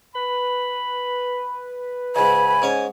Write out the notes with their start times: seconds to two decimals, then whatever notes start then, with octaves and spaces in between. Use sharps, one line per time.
0.15 B4 B5
2.16 C#2 G#2 G#5 B5
2.62 G#2 C#4 C#5